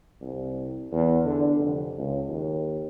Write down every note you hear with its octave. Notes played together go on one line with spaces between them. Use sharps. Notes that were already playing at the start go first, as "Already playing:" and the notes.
C2
E2
D3
F1
C#2
D#2